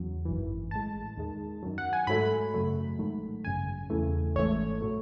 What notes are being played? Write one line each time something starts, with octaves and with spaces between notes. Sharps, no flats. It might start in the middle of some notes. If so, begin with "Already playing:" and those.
Already playing: E2 C#3 F#3
G#1 F#2 E3
A1 A2 G#3 A5
D#2 D#3 G#3
F#2 D#3 F#3
F#5
G#5
G#2 F#3 A3 B5
F#2 C#3 F#3 A3
A1 G#2 D#3 F#3 A3
G#1 F#2 C#3 G#5
E2 C#3 E3 A3
G#1 G#2 E3 A3 C#5
A2 F#3 A3